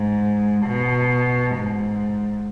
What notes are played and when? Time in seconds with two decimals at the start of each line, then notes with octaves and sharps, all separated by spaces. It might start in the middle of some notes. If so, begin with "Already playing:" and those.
Already playing: G#2
0.65 B2
1.55 G#2